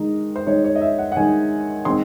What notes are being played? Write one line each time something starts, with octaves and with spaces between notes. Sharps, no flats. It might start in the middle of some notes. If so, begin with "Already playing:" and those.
Already playing: D#3 G#3 D#4
C5
D#3 G#3 D#4 C#5
C#5
D#5
E5
F#5
F#5
D#3 G#3 D#4 G#5
D#3 G#3 C4 C6